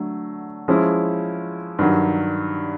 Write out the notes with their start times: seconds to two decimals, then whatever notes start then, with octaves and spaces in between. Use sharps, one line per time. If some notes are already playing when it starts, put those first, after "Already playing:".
Already playing: D3 F#3 A3
0.68 F3 G#3 C#4 E4
1.79 G2 D#3 F#3